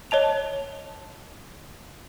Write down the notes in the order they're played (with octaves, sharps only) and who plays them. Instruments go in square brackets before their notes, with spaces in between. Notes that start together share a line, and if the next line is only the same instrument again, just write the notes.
[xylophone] C#5 D#5 A5 F7